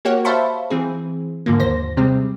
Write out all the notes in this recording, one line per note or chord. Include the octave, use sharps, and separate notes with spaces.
A#3 F#4 G4 C#5 F#5
C5 E5 F5 A5 B5 C#6
E3 C4 G#4
G#2 D3 F3 A#3
D#2 C5 A#6
C3 G3 G#3 C4